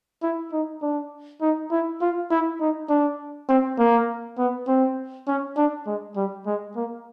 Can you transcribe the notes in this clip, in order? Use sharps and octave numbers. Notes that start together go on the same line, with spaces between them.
E4
D#4
D4
D#4
E4
F4
E4
D#4
D4
C4
A#3
B3
C4
C#4
D4
G#3
G3
G#3
A#3